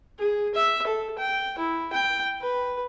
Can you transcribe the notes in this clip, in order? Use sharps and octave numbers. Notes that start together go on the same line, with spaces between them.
G#4
E5
A4
G5
E4
G5
B4